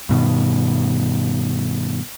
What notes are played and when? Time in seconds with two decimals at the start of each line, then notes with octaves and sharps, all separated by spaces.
0.09 G2 B2 D#3